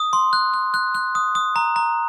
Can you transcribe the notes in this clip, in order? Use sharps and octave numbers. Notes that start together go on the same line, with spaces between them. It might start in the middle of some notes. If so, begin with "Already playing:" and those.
Already playing: D#6
C6
F#6
F#6
F#6
F#6
D#6
D#6
A#5
A#5